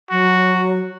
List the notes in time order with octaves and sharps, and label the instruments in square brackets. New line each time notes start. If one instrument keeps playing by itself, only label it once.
[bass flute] F#3 [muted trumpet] F#4